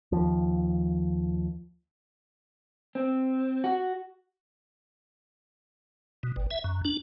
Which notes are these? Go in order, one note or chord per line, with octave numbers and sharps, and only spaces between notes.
D#2 F3
C4
F#4
B2
G1
E5
F#2
D4